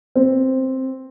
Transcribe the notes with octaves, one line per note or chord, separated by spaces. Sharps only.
C4